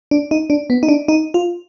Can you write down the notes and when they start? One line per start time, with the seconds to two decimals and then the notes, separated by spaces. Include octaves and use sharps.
0.11 D4
0.31 D#4
0.50 D4
0.70 B3
0.83 D#4
0.89 D4
1.08 D#4
1.34 F4